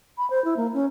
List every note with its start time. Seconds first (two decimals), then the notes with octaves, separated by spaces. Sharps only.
0.18 B5
0.30 C5
0.45 E4
0.57 A#3
0.74 C#4